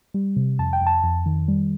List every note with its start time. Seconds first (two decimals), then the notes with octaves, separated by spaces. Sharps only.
0.14 G3
0.36 C3
0.59 F2 A5
0.73 G5
0.81 F2
0.87 A5
1.03 F2
1.26 D#3
1.48 G3